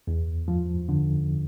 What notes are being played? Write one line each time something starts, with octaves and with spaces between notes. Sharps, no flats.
E2
F3
D3